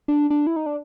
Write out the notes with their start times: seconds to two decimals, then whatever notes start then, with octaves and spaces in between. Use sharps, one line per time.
0.08 D4
0.30 D4
0.47 E4
0.56 D#4
0.66 D4